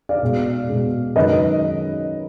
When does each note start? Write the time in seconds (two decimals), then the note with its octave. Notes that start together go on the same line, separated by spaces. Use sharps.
0.09 D5 F5
0.22 B2 G#3
0.69 B2 G#3
1.15 F#2 D#3 G#3 B4 D#5